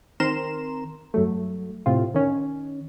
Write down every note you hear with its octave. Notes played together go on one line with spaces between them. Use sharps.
D#3 C4 A#4 A#5 C6 E7
G2 F#3 A3
A2 C3 C4 F4
D#3 C#4